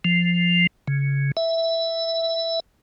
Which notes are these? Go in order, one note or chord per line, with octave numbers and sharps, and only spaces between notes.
F3
C#3
E5